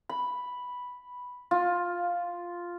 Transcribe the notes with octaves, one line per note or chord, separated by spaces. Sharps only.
B5
F4